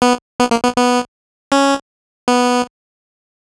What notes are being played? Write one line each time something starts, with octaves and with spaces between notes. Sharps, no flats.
B3
B3
A#3
B3
B3
C#4
B3